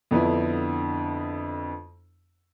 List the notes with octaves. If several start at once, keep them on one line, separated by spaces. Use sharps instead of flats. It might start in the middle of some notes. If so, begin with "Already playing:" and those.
F2 D3 B3 D4 E4